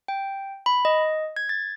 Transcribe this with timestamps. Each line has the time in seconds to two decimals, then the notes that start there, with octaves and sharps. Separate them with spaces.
0.08 G5
0.66 B5
0.85 D#5
1.36 G#6
1.49 A6